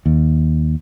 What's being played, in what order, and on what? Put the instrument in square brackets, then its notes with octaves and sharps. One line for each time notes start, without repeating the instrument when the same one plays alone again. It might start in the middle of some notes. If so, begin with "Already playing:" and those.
[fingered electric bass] D#2